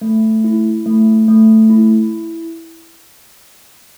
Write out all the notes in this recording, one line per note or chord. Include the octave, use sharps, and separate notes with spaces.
A3
E4
A3
A3
E4